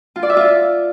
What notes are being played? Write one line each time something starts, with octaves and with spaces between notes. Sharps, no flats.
F4
D5
E5
F4